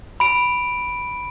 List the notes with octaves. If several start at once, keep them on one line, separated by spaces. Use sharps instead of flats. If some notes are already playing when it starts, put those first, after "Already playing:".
B5 D7